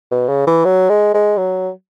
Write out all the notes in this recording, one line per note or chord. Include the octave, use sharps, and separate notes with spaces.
B2
C#3
E3
F#3
G#3
G#3
F#3